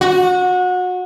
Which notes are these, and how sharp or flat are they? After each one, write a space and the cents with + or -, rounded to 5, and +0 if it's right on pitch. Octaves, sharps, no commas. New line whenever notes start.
F#4 -25